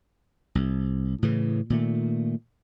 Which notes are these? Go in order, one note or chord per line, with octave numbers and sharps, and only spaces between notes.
C2
A2 C#3 E3
A#2 D#3 A3